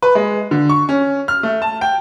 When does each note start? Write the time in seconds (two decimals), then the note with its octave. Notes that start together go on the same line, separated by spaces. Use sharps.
0.03 B4
0.15 G#3
0.51 D3
0.69 C#6
0.89 C#4
1.28 F6
1.43 A3
1.62 A5
1.81 G5